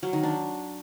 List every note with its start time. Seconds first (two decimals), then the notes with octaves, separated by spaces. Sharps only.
0.03 F#3
0.13 D#3
0.23 D4